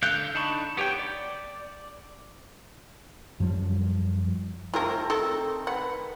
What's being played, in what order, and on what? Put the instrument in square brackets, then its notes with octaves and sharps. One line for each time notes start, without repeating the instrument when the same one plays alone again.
[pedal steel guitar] D3 A4 F5 F#6 G6
D4 D#4 A5 B5 C#6
B3 G4 C#5 G5
D5
[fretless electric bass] F#2 F3 G3
[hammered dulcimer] D#3 A3 C4 [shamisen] F4 G#4 A#4
[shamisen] A4 A#4
[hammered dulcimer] B4 [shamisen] F#5